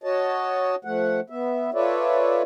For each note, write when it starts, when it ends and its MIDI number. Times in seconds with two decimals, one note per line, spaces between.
0.04 0.75 66
0.04 0.75 73
0.04 0.75 75
0.04 0.75 81
0.85 1.20 53
0.85 1.20 57
0.85 1.20 78
1.30 1.70 59
1.30 1.70 76
1.74 2.42 65
1.74 2.42 69
1.74 2.42 71
1.74 2.42 73
1.74 2.42 74
1.74 2.42 76